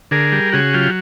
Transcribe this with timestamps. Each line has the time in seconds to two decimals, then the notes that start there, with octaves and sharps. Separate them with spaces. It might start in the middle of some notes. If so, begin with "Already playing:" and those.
0.11 D3 G#4 A#4
0.32 G3
0.53 C#3 F#4 G#4
0.73 F#3 F4 G4